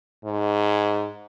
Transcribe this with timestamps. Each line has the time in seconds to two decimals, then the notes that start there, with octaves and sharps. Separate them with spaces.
0.25 G#2